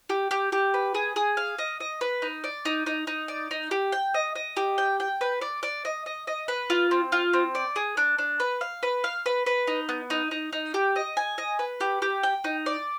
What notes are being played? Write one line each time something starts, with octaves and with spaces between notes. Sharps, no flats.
G4
G4
G4
B4
G#4
G#4
F5
D#5
D#5
B4
D#4
D5
D#4
D#4
D#4
D5
D#4
G4
G5
D#5
D#5
G4
G5
G5
B4
D5
D5
D#5
D#5
D#5
B4
F4
C4
F4
C4
D5
G#4
D4
D4
B4
F5
B4
F5
B4
B4
D#4
B3
D#4
D#4
D#4
G4
D#5
G#5
D#5
B4
G4
G4
G5
D#4
D5